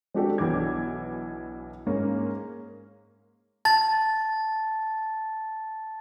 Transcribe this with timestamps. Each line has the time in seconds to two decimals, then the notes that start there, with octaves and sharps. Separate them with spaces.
0.14 G#3 C4 D4 F#4 G4 A4
0.38 B1 E3 D4 D6 G#6
1.87 G#2 A#3 C#4
3.65 A5 A6